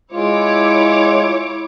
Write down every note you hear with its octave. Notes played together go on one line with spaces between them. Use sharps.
G#3 E4 F4 C#5 D6